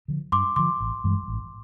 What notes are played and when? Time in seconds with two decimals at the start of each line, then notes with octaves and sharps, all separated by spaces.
0.08 D3 F3
0.32 G2 C6 D6
0.56 D3 F3 C6 D6
0.80 A1
1.04 G2 E3 G#3
1.28 A1